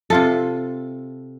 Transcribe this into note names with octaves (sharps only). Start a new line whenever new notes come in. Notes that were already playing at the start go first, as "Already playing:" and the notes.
C3 F4 A4